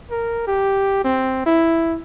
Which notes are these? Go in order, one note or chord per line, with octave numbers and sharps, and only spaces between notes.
A#4
G4
C4
E4